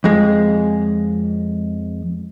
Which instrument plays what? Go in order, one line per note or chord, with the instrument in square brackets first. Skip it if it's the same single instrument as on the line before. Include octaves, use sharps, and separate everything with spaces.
[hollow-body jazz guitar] F2 G#3